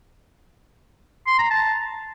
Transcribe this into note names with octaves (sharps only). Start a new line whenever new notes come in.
C6
A#5
A5